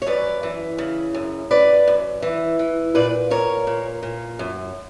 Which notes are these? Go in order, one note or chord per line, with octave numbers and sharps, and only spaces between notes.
C#5
F#2 B4 D5
E3
C#3
F#2
F#2 B4 D5
F#2
E3
E3
A#2 B4 D5
A#2 A#4 C#5
A#2
A#2
F#2